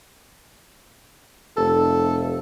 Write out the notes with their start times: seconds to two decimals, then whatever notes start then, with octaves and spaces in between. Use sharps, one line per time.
1.57 F1 A4